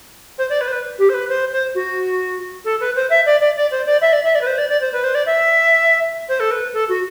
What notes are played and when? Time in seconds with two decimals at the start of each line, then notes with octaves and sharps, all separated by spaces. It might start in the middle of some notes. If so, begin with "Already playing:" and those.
0.38 C5
0.49 D5
0.60 B4
0.67 C5
0.72 B4
0.98 G4
1.09 C5
1.13 B4
1.29 C5
1.52 C5
1.74 F#4
2.65 A4
2.80 B4
2.95 C5
3.10 E5
3.25 D5
3.40 D5
3.56 D5
3.71 C5
3.86 D5
4.01 E5
4.12 D5
4.24 E5
4.35 D5
4.41 B4
4.46 C5
4.58 D5
4.69 D5
4.81 C5
4.92 B4
5.03 C5
5.14 D5
5.26 E5
6.28 C5
6.39 A4
6.51 B4
6.73 A4
6.88 F#4